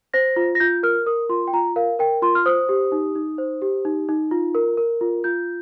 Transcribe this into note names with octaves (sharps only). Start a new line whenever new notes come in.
C5 A#6
F4
A#6
F4 G6
A#4 F6
A#4 D#6
F4 C6
G5
F4 A#5
A#4 F5
A#4 G5
F4 C6
F6
C5 D#6
G4
D#4
D#4
C5
G4
D#4
D#4
F4
A#4
A#4
F4
F4 G6